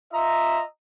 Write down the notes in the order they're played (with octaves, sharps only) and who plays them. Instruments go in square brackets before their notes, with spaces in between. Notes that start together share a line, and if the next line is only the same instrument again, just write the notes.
[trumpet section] F4 D#5 E5 A#5